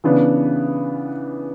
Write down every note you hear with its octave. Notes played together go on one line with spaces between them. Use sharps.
C#3 E3 B3 D4